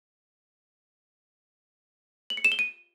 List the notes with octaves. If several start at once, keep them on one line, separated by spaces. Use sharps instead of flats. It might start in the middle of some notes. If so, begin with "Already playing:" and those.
F#7
C#7
E7
G7
D#7